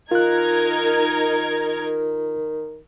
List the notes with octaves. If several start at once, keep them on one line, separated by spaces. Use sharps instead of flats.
D#3 D#4 F4 A#4 F#6 G#6